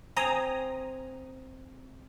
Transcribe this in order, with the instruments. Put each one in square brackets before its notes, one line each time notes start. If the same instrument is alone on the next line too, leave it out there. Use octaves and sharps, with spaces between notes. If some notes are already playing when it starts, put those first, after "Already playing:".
[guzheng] C4 [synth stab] G#5 A#5 D#6